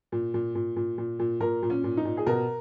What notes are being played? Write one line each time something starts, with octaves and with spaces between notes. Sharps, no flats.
A#2
A#2
A#2
A#2
A#2
A#2
A#2 A#4
A#2
C#4
A#2
D#4
A#2
G#4
B2 A#4